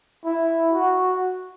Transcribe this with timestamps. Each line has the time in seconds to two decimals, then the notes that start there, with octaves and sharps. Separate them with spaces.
0.25 E4
0.71 F#4